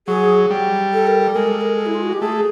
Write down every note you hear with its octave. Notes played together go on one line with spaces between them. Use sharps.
F#3 G#4
G3
A4
A#4
A4
G#3 A#4
A4
A#4
A4
E4
F4
F#4
G4
A3 G#4